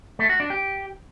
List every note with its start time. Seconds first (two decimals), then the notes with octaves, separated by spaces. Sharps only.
0.19 A3
0.29 F#4
0.40 D4
0.50 G4